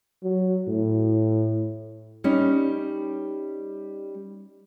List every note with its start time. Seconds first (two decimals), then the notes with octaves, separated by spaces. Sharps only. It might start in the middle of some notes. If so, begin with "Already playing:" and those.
0.23 F#3
0.68 A2
2.24 G3 C#4 D#4